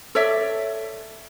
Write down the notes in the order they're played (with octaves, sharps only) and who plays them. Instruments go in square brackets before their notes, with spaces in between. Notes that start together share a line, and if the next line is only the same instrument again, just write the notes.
[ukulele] A4 C#5 D5 E5